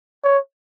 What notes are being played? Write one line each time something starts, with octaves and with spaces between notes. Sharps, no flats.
C#5